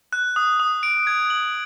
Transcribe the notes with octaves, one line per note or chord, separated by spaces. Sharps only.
F#6
D#6
D#6
D7
G#6
F#7